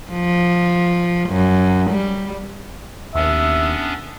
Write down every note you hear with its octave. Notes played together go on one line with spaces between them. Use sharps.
F3
F#2
G3
D#2 B3 C#4 D4 E5